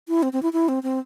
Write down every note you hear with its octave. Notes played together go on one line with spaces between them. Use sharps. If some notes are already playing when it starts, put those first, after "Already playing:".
E4
C4
C4
E4
E4
C4
C4